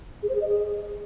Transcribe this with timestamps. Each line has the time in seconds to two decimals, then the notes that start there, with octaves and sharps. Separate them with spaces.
0.23 G#4
0.29 C5
0.35 G#4
0.41 D#5
0.48 G#4